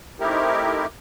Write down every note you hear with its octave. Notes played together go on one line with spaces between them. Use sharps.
A3 C4 D#4 E4 G4 A#4